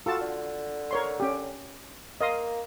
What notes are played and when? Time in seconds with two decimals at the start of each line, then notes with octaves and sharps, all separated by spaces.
0.06 F4 F#4 A4 A5
0.21 D3
0.91 A#4 C#5 C6
1.20 C#4 G4
2.21 A#3 D#5 F5 C6